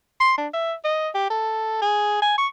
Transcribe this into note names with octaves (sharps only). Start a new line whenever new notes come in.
C6
D4
E5
D#5
G4
A4
G#4
G#5
C#6